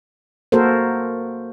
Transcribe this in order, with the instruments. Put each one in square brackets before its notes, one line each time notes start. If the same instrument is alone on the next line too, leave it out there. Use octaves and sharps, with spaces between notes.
[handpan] A#3 F#4 A4 A#4 C5